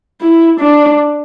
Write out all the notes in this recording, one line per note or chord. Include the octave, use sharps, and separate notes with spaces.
E4
D4